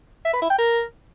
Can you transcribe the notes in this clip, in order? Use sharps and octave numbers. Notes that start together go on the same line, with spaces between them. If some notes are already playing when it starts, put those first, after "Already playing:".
E5
B4
E4
G5
A#4